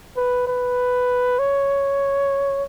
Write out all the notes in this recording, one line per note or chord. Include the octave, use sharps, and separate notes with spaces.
B4
B4
C#5